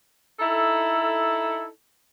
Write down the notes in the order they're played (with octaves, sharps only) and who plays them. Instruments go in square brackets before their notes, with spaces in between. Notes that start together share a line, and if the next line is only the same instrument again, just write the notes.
[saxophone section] D#4 E4 A4